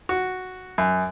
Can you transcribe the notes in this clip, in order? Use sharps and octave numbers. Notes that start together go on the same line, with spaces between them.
F#4
F#2